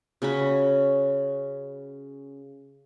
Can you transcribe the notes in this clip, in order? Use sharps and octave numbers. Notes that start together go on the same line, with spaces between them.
C#3 C#4 F#4 B5